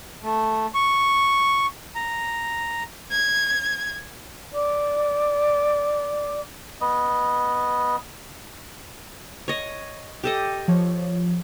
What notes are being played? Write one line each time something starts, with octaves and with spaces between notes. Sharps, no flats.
A3
C#6
A#5
G#6
D5 D6
B3 D#5
C#5 D#5
G4 A4 D#5
F3 C#5